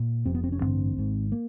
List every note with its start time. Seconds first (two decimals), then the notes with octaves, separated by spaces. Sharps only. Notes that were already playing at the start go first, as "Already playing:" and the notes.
Already playing: A#2
0.25 F1 F2 C3 C4
0.35 B3
0.44 C4
0.52 C#4
0.61 A1 G2 D3 C4
0.96 G#1 G#2
1.32 A#3